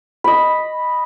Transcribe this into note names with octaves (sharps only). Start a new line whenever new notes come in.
D#5 B5